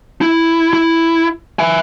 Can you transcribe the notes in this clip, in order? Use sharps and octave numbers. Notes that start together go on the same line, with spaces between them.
E4
E4
E5 G#5